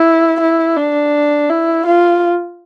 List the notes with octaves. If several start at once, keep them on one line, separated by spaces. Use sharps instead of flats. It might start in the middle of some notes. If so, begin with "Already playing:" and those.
Already playing: E4
E4
D4
E4
F4